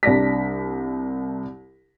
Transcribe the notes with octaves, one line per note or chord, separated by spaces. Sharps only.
C2 D4 A#6 B6